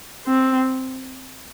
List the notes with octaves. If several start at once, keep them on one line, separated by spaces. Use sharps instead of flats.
C4